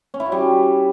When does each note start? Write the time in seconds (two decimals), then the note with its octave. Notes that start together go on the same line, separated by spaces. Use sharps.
0.14 C#4
0.20 E4
0.26 F#4
0.32 G3